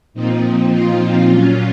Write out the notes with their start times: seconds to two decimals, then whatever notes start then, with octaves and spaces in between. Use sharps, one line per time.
0.14 A#2 F3 C4 D#4
0.70 F4
1.26 A#2 F#3 C#4